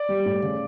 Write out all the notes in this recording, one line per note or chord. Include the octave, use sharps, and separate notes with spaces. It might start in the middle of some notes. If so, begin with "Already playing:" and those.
Already playing: D5
G3
A2
C#3